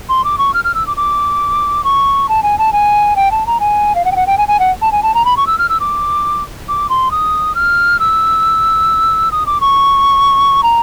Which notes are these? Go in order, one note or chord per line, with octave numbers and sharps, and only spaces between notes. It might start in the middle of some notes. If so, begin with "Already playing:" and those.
C6
D6
C#6
F6
F6
E6
D6
D6
C#6
A5
G#5
A5
G#5
G5
A5
A#5
G#5
F5
F#5
G5
F#5
G5
G#5
G#5
F#5
A5
G#5
A5
A#5
B5
C#6
E6
F6
E6
D6
D6
C6
D#6
F6
E6
D#6
D6
C#6
A#5